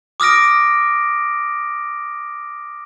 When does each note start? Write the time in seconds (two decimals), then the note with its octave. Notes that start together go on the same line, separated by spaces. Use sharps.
0.20 D6 D#6 F6 A#6 D7